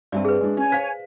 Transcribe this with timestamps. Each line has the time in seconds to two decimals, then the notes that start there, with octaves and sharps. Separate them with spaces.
0.12 G2 G3 C4 D5 E5 A5
0.25 G#4 B4
0.41 G#3 D4
0.57 C#4 C#5 G#5
0.72 C5 F5 B6